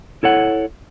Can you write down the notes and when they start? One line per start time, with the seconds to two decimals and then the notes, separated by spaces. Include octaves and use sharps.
0.23 E4 A4 C#5 F#5